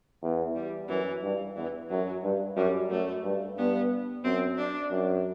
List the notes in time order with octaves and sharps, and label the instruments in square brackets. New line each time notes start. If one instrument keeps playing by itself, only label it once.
[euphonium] E2
[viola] G3
[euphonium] F#2 [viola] E3
[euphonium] G2
[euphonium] E2 [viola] E3
[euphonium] F#2 [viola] F#3
[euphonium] G2
[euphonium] F#2 [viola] G3
[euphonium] F#2 [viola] A3
[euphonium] G2
[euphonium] G2 [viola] B3
[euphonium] F#2 [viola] C4
[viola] D4
[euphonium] F#2